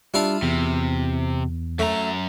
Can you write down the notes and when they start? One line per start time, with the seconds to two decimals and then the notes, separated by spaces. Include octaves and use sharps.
0.14 G3 D4 E4 F4 F5
0.42 E2 C3
1.79 F#2 A3 A#5